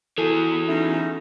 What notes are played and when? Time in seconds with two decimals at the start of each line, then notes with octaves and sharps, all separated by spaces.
0.18 E3 E4 F#4 G#4 A4
0.68 A3 C#4 D#4